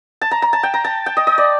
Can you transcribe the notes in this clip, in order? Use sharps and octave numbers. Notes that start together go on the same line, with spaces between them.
A5
A#5
A#5
A5
G5
A#5
A5
G5
D#5
D#5
D5